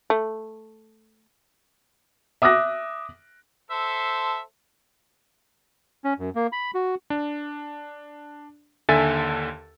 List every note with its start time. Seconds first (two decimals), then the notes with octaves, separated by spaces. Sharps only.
0.10 A3
2.42 E5 D6 D#6 F#6 A#6
3.71 A4 C5 E5
6.04 C#4
6.19 F#2
6.35 A#3
6.52 B5
6.75 F#4
7.10 D4
8.89 D#2 D3 A4 E5 G#5 A6